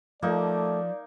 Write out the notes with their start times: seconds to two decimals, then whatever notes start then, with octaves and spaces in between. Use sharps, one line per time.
0.22 F3 A3 A#3 D#4 D5